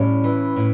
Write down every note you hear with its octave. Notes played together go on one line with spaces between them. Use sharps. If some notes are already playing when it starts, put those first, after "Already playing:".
Already playing: A2 G3 C#4
E3
A2